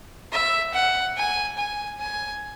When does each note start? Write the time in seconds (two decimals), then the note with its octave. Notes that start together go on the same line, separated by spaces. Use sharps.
0.32 E5
0.74 F#5
1.17 G#5
1.58 G#5
2.00 G#5